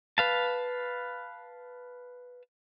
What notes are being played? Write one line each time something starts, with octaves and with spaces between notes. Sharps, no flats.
B4 F5 A5